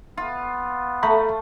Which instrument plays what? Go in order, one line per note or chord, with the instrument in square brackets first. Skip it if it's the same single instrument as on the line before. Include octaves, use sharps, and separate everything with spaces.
[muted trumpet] B3 [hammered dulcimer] F4
[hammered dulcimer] A3 [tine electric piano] A#5 B5 C#6